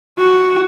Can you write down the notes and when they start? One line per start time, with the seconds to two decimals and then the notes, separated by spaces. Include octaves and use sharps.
0.18 F#4